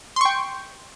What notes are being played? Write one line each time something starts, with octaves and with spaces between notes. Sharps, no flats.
G5 C6 C#6